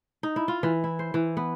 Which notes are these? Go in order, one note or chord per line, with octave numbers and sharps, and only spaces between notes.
D#4
E4
F4
E3
E4
C5
E3
B3